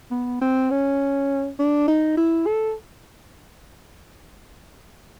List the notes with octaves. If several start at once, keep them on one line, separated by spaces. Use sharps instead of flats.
B3
C4
C#4
D4
D#4
E4
A4